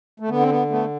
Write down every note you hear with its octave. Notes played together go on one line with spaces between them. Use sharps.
A3
D3 B3
C4
B3
A3 B3